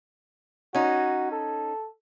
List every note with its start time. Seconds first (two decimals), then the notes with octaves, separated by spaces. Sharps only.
0.75 C#4 D#4 F#4
1.32 A4